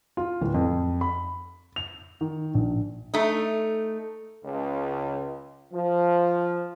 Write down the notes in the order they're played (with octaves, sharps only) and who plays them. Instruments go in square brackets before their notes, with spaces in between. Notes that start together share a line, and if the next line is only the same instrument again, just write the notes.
[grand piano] F4
D1
F2
B5
F7
D#3
A#1
[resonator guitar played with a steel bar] A3 D#4
[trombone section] C#2
F3